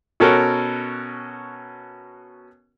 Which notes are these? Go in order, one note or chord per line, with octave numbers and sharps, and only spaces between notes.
B2 C#4 F#4 A4 A#4